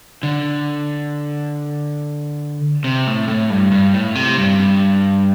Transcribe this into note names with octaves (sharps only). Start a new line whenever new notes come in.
D3
C3
A2
A2
G2
G2
A2
C3
G2
G2